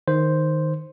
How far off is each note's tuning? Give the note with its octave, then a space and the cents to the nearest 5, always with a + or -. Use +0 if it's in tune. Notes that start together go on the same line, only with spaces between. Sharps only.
D#3 +0 C5 +0